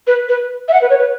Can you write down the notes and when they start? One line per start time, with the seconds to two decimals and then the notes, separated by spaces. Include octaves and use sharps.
0.07 B4
0.29 B4
0.68 E5
0.73 F#5
0.82 B4
0.90 C#5
0.99 B4